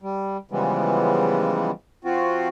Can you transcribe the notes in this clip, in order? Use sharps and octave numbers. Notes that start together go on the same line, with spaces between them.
G3
C#3 E3 F3 G3 G#3 B3
F3 C4 F4 F#4